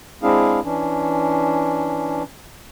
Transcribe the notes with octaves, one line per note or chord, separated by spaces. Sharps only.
G#3 C4 D4 E4 G#4 F5
E3 C#4 D4